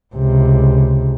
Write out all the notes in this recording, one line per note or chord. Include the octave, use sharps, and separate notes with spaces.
C#2 C3